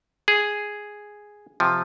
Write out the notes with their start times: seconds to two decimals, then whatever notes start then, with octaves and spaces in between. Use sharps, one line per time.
0.28 G#4
1.60 C3 F3